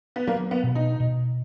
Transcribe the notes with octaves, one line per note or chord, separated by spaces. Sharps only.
B3
F#3 A#3
B3
B2
D#4
B2